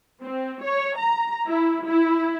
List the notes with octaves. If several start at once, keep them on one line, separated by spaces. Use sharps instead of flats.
C4
C#5
A#5
E4
E4